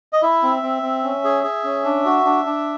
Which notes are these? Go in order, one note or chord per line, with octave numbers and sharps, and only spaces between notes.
D#5
E4 E5
C4
C4
C4
C#4
G#4
G#4
C#4
D4
F#4
D4
D4